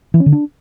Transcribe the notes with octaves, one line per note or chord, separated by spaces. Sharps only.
E3
C#4
D3
D4